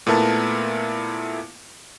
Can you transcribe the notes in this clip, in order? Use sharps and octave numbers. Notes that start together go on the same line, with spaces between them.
A#2 A3 B3 E4 A#4 A5